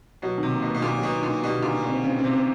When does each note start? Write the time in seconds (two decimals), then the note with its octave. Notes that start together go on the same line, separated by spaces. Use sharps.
0.22 B2 F#3
0.38 D#3
0.43 C3
0.53 A#3
0.62 B2
0.67 A#3
0.74 B2
0.82 A#2 A#3
0.98 F#3
1.03 B2
1.12 D#3
1.23 A#2
1.28 D#3
1.43 B2 G3
1.58 A#2 D3
1.73 D3
1.82 B2
1.88 C4
2.03 C#3 C4
2.19 C4
2.24 C3
2.34 C4